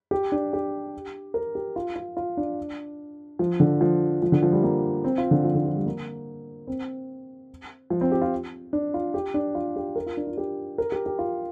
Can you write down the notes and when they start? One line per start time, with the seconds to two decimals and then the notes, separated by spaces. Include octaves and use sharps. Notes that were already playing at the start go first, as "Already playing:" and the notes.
0.11 G4
0.32 D4
0.53 G4
1.34 A#4
1.55 G4
1.76 F4
1.96 F4
2.17 F4
2.37 D4
3.39 F3
3.60 D3
3.81 F3
4.22 F3
4.32 D3
4.43 F3
4.52 G3
4.63 A#3
5.04 C4
5.18 F4
5.31 D3
5.44 F3
5.55 D3
5.65 F3
5.76 G3
5.86 A#3
6.67 C4
7.90 F3
8.01 C4
8.12 G4
8.22 F4
8.73 D4
8.94 F4
9.14 G4
9.34 D4
9.55 F4
9.76 G4
9.96 A#4
10.06 F4
10.17 D4
10.27 F4
10.37 G4
10.78 A#4
10.92 G4
11.06 G4
11.19 F4